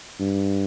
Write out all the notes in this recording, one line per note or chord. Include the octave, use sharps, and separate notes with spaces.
G2